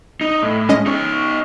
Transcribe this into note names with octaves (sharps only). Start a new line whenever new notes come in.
D#4
A2
G#3 C#4 D#5
D#4 C#5